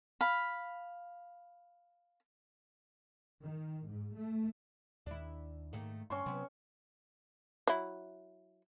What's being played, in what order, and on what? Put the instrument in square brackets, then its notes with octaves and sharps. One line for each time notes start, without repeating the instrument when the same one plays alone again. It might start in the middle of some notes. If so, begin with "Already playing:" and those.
[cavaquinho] F5 B5
[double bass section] D#3
G#2
A3
[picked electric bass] D#2 D#3 [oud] D4 E4
[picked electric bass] G#2 [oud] D#3 A3 A#3
[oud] D2 C4 [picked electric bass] G2 [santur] C#4 C#5 C6
[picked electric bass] C3 F#3 [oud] B3 C4
[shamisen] F#3 E4